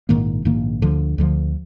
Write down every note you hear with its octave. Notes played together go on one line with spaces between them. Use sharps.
A#1 G#2 D#3 A#3
A#1 G#2 D#3 A#3
D2 D3 F3
D2 D3 F3